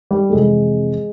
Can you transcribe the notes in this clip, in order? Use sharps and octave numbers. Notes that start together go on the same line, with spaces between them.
G3
A3
F2 C3 E3 G#3